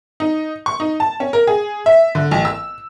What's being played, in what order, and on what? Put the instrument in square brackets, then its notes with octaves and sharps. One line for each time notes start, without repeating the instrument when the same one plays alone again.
[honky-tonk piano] D#4
C#6
D#4
A5
C#4
A#4
G#4
E5
D3
A1
E6